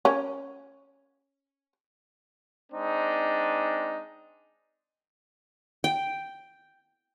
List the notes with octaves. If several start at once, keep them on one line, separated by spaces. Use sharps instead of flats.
C#4 A#4
G#3 C4 D4 D#4
G5